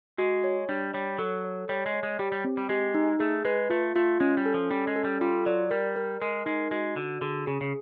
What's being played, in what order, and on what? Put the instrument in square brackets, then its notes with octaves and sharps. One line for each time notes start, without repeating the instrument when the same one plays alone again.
[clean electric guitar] G#3 [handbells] F#4
[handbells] C#5
[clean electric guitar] G3 [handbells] D4
[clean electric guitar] G3 [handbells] C#5
[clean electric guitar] F#3 [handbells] A4
[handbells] C#5
[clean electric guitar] G3 [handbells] C#5
[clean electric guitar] G#3
[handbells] C#5
[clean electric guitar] G#3
[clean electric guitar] G3 [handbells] G4
[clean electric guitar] G3
[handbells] C4
[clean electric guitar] G3
[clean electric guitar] G#3 [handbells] G4
[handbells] D#4
[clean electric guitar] A3 [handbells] G#4
[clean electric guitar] G#3 [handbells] B4
[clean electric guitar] A3 [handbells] F4
[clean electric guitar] A3 [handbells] F4
[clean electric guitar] G#3 [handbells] C#4
[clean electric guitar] G3
[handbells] A4
[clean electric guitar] F3
[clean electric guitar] G3 [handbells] C#4
[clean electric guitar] G#3
[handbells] A4
[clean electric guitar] G3
[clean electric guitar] G3 [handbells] F4
[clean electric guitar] F#3 [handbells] D5
[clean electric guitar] G3 [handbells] A#4
[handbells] A#4
[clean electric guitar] G#3 [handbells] A#4
[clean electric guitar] G#3 [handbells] D#4
[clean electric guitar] G#3 [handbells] F#4
[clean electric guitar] D3 [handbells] F#4
[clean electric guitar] D3 [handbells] G#4
[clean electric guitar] C#3 [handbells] G#4
[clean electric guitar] C#3